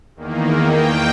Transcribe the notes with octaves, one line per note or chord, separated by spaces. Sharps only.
E2 D#3 A#3
G5